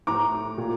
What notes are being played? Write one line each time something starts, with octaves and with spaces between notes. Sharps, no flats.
A2 A#5 D6
A#2